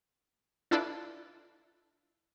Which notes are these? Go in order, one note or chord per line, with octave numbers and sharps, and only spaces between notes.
D4 E4 F4 A4 B4 D5